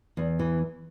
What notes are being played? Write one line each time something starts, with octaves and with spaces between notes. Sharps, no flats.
E2
E3